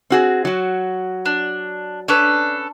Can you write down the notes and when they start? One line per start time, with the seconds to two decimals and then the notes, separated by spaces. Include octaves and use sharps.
0.10 C4 F#4 G#4
0.45 F#3 F#4
1.25 D4
2.08 C#4 D4 A4 B4